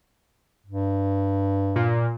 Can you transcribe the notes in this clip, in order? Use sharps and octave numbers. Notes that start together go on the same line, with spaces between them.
G2
A#2